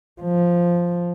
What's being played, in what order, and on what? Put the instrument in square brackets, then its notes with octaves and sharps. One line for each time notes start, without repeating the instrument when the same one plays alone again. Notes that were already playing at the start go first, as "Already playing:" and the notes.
[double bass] F3